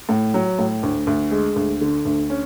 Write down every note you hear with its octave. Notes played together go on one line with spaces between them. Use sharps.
A2
F#3
A2
D2
D2
G#3
D2
D3
D2
C#4